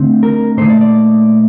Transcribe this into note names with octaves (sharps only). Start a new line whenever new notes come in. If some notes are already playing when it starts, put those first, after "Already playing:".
Already playing: D3 A3 C4 D#4
A#4
A#2 A3 D#4 C5
D5
D5